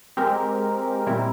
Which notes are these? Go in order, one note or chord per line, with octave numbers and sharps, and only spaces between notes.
G#3 C4 G4 A#4
A#2 G3 C4 E4 A#4